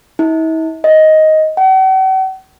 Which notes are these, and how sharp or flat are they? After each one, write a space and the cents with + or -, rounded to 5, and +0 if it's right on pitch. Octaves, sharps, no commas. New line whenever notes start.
E4 -45
D#5 +10
F#5 +45